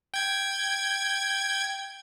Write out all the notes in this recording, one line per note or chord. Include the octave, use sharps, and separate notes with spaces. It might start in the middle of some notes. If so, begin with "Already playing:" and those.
G5 G#6